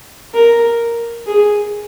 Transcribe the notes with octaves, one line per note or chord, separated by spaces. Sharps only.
A#4
G#4